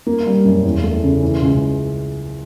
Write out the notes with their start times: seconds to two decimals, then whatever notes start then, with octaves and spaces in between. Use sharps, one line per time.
0.07 A#3
0.26 G3
0.45 F#2
0.65 E2
0.83 A3
1.04 C#3
1.23 E3
1.42 C#2